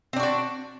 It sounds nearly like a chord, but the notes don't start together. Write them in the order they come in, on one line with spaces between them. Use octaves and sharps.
C4 D4 F#4 D5